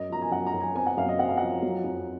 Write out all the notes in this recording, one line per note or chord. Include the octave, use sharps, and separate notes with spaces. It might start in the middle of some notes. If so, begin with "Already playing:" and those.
Already playing: F#2 D#5
F3 A#5
G#5
F#2 F#5
A#5
F#2
G#5
C4 G#5
F#5
F#2 F5
D#5
C4 F#5
F5
F3 F#5
F#3
F2